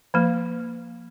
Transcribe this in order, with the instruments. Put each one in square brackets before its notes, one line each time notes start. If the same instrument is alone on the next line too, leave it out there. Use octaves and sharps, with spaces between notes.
[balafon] F3 A#3